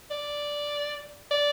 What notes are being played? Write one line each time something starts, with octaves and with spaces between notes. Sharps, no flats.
D5
D5